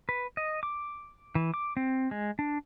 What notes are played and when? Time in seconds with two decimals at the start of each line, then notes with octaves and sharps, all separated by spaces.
0.09 B4
0.37 D#5
0.63 D6
1.35 E3
1.54 D6
1.77 C4
2.11 G#3
2.39 D4